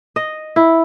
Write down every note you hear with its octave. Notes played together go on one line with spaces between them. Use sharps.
D#5
E4